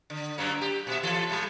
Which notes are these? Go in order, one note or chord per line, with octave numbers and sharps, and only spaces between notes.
D3
F#2 F#3 A#3
G4
A#2 E5
E3 A4
A2 G3